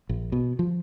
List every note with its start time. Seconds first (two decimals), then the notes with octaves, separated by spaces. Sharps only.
0.09 A#1
0.32 B2
0.59 F3